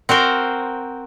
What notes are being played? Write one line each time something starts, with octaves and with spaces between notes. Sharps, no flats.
C4 F#4 A#4 C5